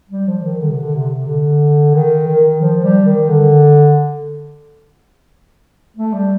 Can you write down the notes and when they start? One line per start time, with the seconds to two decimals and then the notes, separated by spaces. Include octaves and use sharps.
0.09 G3
0.27 F3
0.43 D#3
0.61 D3
0.70 C3
0.80 D3
0.94 C3
1.27 D3
1.94 D#3
2.28 D#3
2.61 F3
2.84 G3
3.05 D#3
3.29 D3
5.96 A3
6.13 G3